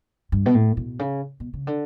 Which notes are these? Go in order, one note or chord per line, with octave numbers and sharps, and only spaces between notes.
G2
B2
A2
B2
C#3
B2
C#3
D3